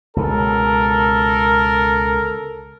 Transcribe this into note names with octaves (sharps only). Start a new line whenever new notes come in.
C#2 B2 A4 A#4